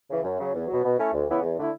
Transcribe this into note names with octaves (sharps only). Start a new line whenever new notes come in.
C#3 E3
F#2
C#3 F#3
E2
F#3
B2
B2
A3 C#4 E4
D2
C#3 E3 B3 E4
E2
D3 A3 E4